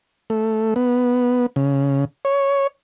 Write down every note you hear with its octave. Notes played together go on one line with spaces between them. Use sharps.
A3
B3
C#3
C#5